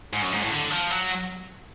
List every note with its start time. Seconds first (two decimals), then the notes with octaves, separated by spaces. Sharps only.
0.13 G#2
0.22 F#2
0.32 G#2
0.42 A2
0.52 D3
0.70 F3
0.91 F#3